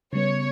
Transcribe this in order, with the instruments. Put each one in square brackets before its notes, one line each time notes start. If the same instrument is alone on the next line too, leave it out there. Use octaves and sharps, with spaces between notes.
[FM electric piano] C#3 G3 B3 [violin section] C#5